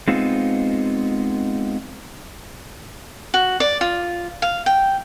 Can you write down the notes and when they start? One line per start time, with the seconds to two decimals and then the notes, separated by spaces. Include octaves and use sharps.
0.08 G#3 B3 C4 D#4 F4
3.34 F#4
3.60 D5
3.81 F4
4.42 F5
4.66 G5